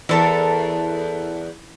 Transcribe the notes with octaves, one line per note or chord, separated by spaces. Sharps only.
E2 E4 A4 A#4